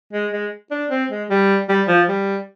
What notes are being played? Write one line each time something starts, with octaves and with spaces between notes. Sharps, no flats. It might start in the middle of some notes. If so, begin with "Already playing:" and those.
G#3
G#3
D4
C4
G#3
G3
G3
F3
G3